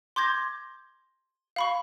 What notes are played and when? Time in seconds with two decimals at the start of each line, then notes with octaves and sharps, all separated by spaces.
0.16 C6 D6 G6 G#6 A#6
1.56 F5 B5 C#6